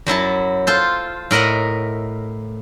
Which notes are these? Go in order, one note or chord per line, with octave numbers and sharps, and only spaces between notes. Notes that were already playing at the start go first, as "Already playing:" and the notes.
F#2 F#3 E4 A5
F4 A4 C5
A2 A#4 D#5 E5 F#5